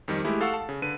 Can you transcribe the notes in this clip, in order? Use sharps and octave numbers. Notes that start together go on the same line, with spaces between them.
F2 D#3 G3
G#3 A3 E4 G4
A4 F5 F#5 C#6 E6
A5
C#3
D3 B4 D#7